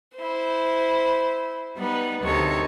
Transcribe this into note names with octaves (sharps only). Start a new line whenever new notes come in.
E4 C5
G3 B3 D#4 B4
D2 C3 D#3 A4 C#5